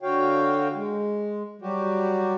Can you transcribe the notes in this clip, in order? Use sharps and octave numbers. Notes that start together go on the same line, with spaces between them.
D3 F#4 C#5 F5 G5
G#3
F#3 G3 F#4 G4